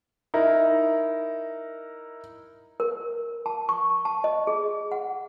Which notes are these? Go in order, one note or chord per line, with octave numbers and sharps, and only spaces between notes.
D#4 E4 A#4
A#4
A5
C#6
A5
D#5
G#4
F#5